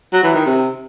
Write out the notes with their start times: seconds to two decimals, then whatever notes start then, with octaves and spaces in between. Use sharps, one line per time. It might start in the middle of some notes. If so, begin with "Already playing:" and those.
0.13 F#3
0.24 E3
0.35 D#3
0.46 C3